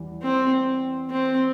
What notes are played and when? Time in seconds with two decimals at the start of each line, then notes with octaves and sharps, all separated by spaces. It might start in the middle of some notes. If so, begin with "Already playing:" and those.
Already playing: E2 E3 G3
0.22 C4
1.10 C4